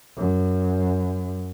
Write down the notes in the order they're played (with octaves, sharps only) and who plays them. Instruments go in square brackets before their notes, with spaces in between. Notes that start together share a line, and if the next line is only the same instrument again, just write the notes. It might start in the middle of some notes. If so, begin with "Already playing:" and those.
[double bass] F#2